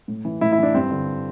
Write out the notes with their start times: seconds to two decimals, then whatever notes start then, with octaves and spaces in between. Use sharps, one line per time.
0.08 A2
0.25 E3
0.41 A2 E4
0.52 E4
0.58 E3 D4
0.74 G2 C4
0.91 D3